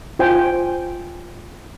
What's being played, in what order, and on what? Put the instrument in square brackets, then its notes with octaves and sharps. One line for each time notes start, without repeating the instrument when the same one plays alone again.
[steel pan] F4 C5 G5 G#5